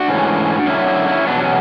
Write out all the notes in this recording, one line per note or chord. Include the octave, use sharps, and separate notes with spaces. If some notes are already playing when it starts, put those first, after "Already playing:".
Already playing: D4 F#4
G#2 E3 A3 C#4
F#2 D3 F#3 C#4 E4
C#4 E4
C#4 E4
E2 B2 F#3 B3 D4
C#4